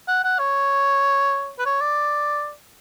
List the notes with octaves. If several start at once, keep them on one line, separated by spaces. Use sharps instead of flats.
F#5
F#5
C#5
B4
C#5
D5